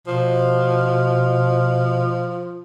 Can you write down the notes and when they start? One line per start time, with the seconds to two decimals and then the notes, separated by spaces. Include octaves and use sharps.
0.07 B2 F3